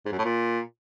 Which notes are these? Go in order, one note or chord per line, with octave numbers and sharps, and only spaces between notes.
G#2
F#2
A2
A#2